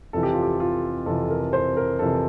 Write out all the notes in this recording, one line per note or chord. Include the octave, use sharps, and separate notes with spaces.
F2 C3 E3 A4
G4
F4
G4
F4
F2 C3 E3 A4
A#4
C5
A#4
F2 C3 E3 A4